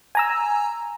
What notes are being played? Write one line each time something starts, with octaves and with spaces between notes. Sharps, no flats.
G#5 A#5 E6